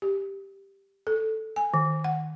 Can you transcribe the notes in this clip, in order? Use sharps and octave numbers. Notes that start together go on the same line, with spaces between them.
G4
A4
G#5
D#3
F#5